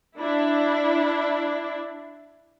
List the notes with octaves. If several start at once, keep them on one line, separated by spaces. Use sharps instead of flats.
D4 E4